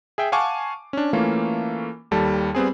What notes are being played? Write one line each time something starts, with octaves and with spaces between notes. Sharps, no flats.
G#4 E5 G5
F5 F#5 G#5 A5 C#6 D6
C#4 D4
E3 A3 A#3 C#4 F4
D#2 G3 A4
G3 B3 C4 G#4